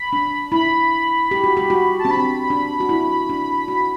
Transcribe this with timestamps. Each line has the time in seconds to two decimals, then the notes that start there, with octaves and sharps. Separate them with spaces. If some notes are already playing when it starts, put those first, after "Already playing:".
Already playing: B5
0.13 D4
0.52 E4 B5
1.31 G4
1.44 F#4
1.57 G4
1.70 F#4
1.99 A5
2.05 C4
2.10 D4 B5
2.50 D4
2.80 F#4
2.89 E4
3.29 D4
3.68 F#4